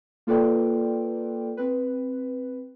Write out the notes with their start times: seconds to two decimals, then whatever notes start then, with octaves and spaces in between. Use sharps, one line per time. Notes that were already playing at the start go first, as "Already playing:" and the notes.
0.27 A#3 F4 A4 B4 D5 G5
1.57 C4 B4